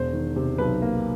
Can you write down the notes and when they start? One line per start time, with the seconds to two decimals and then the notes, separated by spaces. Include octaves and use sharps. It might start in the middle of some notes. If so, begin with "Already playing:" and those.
Already playing: E1 C5
0.13 D#3
0.36 C3
0.58 B1 B4
0.82 A#3